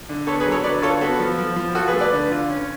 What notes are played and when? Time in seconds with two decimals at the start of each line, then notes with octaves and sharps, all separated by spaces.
0.09 D3
0.27 B3 A4 C#5
0.40 G#4 B4
0.46 F#3
0.51 A4 C#5
0.64 D3 B4 D5
0.82 F4 A4 C#5
1.01 B3 F#4 A4
1.20 F3
1.38 F3
1.56 F3
1.75 F4 F#4 A4
1.88 G#4 B4
1.94 A3
2.00 B4 D5
2.13 D3
2.32 F4
2.50 C#4